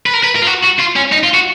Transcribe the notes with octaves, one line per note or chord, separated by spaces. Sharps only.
B4
A#4
B4
A#4
F4
F#4
F#4
F4
C#4
D#4
F4
F#4